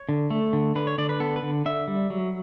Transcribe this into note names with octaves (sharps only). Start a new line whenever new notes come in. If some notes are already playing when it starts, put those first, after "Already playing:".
Already playing: C#5
D3
A3
D3
D3 B4
C#5
D3 D5
B4
B3 A4
B4
D3
D3 E5
G3
F#3